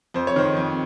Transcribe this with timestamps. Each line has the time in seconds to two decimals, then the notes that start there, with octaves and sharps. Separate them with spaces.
0.14 F2 C5
0.27 C#5
0.36 D#3 C5
0.57 F2